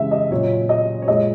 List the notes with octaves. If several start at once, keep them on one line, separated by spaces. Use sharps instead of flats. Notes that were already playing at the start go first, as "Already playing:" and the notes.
Already playing: C#3 E3 G#3 E5
D#5
A#2 F#3 C#5
D#5
C#5
A#2 G#3 D#5